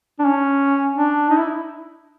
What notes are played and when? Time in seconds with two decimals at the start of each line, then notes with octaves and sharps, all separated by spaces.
0.19 D4
0.25 C#4
0.95 D4
1.30 D#4
1.39 E4